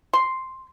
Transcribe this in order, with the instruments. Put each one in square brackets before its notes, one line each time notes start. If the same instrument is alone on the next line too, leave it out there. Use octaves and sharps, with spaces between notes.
[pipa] C6